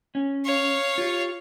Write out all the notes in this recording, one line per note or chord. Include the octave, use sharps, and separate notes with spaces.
C#4
C#5 F5
F4 G4